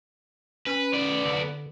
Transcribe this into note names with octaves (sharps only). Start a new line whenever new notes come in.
C#4 B4
B3 D5
D3